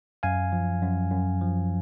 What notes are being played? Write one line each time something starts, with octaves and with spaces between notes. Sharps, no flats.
F#2 F5 G#5
F3
F#2
F#2
F3